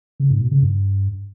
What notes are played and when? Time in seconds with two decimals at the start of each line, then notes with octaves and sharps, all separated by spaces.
0.20 C#3
0.30 G#2
0.41 B2
0.51 C#3
0.62 G2